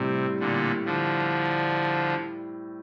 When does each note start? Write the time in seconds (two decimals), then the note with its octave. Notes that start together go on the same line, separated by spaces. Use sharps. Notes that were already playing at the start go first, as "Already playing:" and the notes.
Already playing: A2 C3 G3 C4
0.40 A#2 D3
0.85 D3 F3